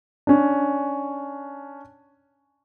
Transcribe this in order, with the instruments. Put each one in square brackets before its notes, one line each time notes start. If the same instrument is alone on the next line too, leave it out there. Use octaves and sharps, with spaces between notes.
[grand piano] C#4 D4